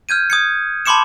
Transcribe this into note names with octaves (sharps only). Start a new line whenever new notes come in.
F6 G6 G#6 D#7
D#6 G#6 C#7
A5 B5 C6 D6 C#7 E7